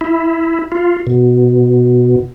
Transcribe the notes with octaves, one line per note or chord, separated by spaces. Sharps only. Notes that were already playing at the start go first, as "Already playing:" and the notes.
E4
F4
B2